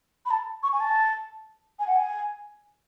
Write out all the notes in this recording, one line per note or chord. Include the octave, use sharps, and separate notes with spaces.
B5
A5
C#6
G#5
A5
G#5
F#5
G#5